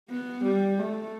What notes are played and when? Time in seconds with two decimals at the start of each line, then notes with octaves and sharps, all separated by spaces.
0.09 B3
0.45 G3
0.79 A3